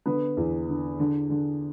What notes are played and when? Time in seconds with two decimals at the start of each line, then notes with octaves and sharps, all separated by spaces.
0.06 D3 B3
0.37 E2
0.68 D3
0.99 D3
1.30 D3